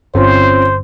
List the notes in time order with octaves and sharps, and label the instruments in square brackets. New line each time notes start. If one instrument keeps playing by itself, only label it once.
[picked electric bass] G1 [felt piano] C4 C#4 F4 [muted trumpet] C5